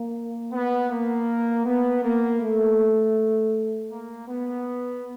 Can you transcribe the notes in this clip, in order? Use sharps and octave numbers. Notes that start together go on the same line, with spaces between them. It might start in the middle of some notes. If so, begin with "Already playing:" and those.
Already playing: A#3
B3
A#3
B3
A#3
A3
A#3
B3